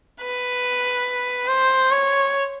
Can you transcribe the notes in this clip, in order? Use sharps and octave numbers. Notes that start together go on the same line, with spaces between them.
B4
C5
C#5